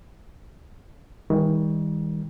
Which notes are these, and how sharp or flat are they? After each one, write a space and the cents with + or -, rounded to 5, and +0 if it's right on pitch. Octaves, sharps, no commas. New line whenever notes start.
D#3 +35 G3 +35